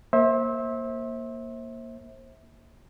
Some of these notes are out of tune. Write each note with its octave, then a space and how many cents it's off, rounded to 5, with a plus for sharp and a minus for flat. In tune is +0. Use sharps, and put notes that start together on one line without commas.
A#3 +0 C5 +30 E5 -20